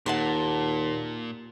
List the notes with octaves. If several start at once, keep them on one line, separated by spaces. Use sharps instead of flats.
D#2 A#2 F#5 A5 C6